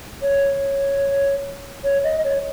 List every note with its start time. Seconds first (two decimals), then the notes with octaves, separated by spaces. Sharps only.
0.22 C#5
1.84 C#5
2.04 D#5
2.24 C#5